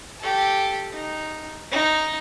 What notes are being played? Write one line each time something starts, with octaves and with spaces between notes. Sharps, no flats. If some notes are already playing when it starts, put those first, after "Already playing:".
G4 A4
D#4
D#4